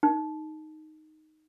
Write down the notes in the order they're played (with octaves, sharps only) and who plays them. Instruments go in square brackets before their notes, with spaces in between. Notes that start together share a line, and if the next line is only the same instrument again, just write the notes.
[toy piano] D#4